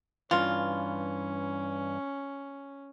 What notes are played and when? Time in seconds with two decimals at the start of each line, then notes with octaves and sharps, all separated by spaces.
0.31 G2 E3 C#4 F4